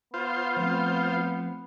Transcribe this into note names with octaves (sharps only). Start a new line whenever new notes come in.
B3 F4 C5
F3 A3 C4